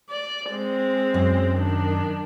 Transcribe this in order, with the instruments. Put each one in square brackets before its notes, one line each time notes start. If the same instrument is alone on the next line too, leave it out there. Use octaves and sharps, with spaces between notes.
[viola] D5
G#3 C4
[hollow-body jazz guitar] F#2
[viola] D#3 D4